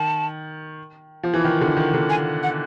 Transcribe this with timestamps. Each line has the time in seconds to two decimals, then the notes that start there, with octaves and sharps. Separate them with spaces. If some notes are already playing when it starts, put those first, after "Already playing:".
Already playing: D#3 A5
1.23 F3
1.34 E3
1.44 D#3
1.61 D3
1.77 D#3
1.94 D3
2.10 G#5
2.43 F#5